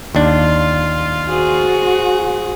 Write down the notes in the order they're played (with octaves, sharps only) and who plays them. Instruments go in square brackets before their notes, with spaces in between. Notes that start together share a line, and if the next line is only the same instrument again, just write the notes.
[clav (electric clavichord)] D#2 D4 [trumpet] F4
[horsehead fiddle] F#4 [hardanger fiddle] G#4 C5